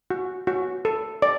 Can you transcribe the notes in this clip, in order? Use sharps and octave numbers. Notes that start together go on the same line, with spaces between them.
F#4
F#4
A4
D5